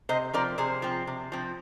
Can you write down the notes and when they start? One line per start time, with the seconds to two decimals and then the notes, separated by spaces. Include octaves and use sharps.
0.09 C3 C5 D#5
0.34 F3 C4 A#4 D5
0.58 C3 G#4 C5
0.82 F3 C4
1.07 C3
1.32 F3 C4